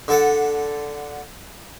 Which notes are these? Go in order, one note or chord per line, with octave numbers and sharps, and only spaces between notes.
D3 A4 F#5